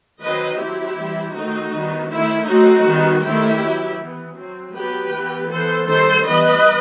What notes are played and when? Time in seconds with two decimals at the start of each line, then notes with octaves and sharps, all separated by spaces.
0.21 D#3 F#3 C4 B4 D#5
0.58 F#3 C4 E4 G4
0.96 E3 G3 C4
1.34 D#3 A3 C4 D#4 F#4
1.72 D#3 G3 B3
2.09 D#3 A3 C4 E4
2.47 F#3 A3 C4 D#4 F#4
2.85 D#3 G3 B3
3.22 D#3 A3 C4 E4 G4
3.60 F#3 B3
3.98 E3 B3
4.35 F#3 C4
4.72 F#3 B3 G4 B4
5.11 E3 B3
5.48 E3 B3 A4 C5
5.85 D#3 G3 C4 A4 C5
6.23 E3 G3 B3 B4 D#5